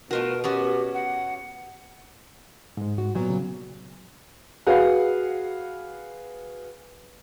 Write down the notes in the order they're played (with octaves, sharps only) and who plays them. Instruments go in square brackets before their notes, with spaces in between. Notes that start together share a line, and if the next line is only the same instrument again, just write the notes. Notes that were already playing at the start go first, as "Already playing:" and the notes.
[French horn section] B2 [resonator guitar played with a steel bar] A3 F4 F#4 [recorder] A#4
[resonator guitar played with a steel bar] B3 C#4 F#4 [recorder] G4
[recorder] F#5
[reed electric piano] G#2 G#3
[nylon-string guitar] F#4
A#2 F#3 B3
[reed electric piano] C#3
[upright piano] F#4 G#4 B4 F5 F#5